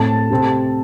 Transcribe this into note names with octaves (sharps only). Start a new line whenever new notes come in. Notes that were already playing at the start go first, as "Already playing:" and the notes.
Already playing: A2 A3 C4 A5
C3 A3 C4